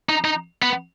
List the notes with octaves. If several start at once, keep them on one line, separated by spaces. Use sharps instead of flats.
D#4
D#4
B3